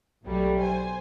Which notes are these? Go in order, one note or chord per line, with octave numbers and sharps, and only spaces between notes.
B1 F#3 G3 A3
C5 G#5